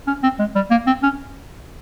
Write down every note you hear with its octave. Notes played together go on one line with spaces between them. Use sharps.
C#4
C4
G#3
G3
A#3
C4
C#4